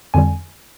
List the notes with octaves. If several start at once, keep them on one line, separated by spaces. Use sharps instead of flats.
F2 D3 G3 G#5